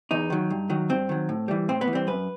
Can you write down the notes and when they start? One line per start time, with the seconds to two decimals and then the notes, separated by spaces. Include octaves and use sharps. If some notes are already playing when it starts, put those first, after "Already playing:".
0.11 E2 D#4
0.30 D#3 F#3
0.50 G2
0.70 D#3 F#3
0.89 G2 C4
1.09 D#3 F#3
1.29 A2
1.48 E3 G3
1.69 A2 C4
1.81 B3
1.88 E3
1.93 G3 C4
2.07 F#2 B4